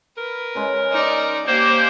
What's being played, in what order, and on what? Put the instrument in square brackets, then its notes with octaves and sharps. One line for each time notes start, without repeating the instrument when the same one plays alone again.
[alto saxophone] A#4 [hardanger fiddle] B4
[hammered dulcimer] C#3 G#3
[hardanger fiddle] D#4 D5
[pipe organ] A#3 C5 [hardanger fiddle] G4